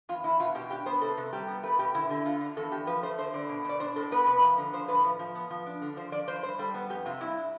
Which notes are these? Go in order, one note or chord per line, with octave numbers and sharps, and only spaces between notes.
E2 F4
E2 E4
B2 F4
B2 G4
D4 G4
B3 C5
C3 A4
C3
G3 G4
B3
A3 B4
B2 G4
D3 E4
D3
D3 F4
D3
E2 A4
E2 G4
F3 B4
A3 C5
D3 C5
D3 D5
B2
B2 D5
D4 C5
A2 A4
B3 B4
C3
F3
D3
F3 C5
A2 B4
F3
F3
B3
F3
D4
D3
F3 C5
F3 D5
F3 C5
G2 C5
G3 A4
B3
F2 G4
C3 F4
G2 E4